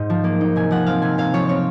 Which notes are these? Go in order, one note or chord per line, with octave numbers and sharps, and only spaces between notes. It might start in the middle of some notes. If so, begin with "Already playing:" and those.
Already playing: G#2 D#4
F3
A#3
D#4
C3 G#5
F3 F#5
C4 F5
C3 G#5
C3 F5
F3 C#5
C4 C#5